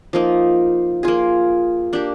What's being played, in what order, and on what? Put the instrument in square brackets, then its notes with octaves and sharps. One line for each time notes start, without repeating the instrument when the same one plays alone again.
[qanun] F3 A#3 D#4
A#3 F4 G#4
A#3 D4 G4